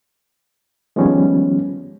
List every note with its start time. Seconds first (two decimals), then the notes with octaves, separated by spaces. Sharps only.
0.96 D#3 F3 G3 G#3 B3 C#4